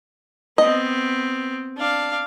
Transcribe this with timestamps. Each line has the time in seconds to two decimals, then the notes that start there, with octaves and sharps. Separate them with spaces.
0.58 B3 C4 D#5
1.77 D4 F5